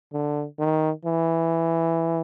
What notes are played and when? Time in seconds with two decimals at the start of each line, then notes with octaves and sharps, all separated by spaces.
0.13 D3
0.59 D#3
1.05 E3